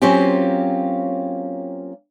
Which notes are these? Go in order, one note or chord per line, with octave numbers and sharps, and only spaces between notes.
F#3 A#3 C4 C#4 F4 G4